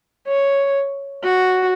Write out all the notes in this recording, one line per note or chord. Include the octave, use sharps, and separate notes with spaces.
C#5
F#4